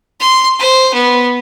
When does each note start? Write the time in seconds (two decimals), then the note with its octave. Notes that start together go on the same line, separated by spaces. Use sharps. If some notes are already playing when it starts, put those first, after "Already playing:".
0.20 C6
0.59 C5
0.94 B3